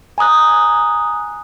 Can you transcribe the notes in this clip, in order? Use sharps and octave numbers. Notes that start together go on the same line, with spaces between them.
G#5 A#5 D#6 F#6